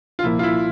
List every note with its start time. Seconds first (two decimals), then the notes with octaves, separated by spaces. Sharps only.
0.19 F4
0.24 C2 A#2 F3 A#3 E4
0.39 F4
0.43 E4